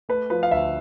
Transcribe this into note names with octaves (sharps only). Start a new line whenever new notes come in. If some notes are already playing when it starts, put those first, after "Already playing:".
A3 B4
F3 B4
F5
D2 E5